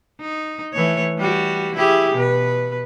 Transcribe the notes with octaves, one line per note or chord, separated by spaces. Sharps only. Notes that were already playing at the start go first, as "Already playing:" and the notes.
D#4
E3 A3 C#5
G3 F#4
E4 G4 G#4
B2 B4